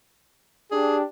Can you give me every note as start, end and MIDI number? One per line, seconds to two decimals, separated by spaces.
0.71 1.02 62
0.71 1.02 67
0.71 0.97 68